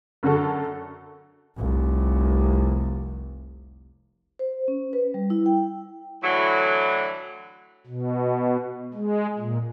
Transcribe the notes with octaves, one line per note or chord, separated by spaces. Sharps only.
F#2 D3 F#4 A4
F1 C2
C5
C#4
B4
G3
E4
G5
A2 D3 E3 F#3
B2
G#3
A#2